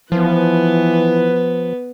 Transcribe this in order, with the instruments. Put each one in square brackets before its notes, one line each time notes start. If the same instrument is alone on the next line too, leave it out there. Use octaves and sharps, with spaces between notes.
[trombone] E3 [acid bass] F3 [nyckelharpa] B3 B4